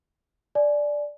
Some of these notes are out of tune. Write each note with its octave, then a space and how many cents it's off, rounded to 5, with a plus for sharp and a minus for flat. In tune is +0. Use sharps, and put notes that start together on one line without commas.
D5 +0 G#5 +25